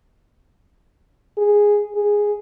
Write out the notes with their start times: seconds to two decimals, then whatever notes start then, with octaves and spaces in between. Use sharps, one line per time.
1.38 G#4
1.96 G#4